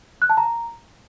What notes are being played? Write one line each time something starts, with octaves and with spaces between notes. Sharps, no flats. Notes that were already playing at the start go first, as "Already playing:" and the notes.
F#6
A5
A#5